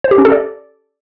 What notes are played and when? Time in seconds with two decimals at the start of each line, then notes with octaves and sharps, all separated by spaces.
0.04 C5
0.11 G4
0.18 C#4
0.25 A4
0.32 D5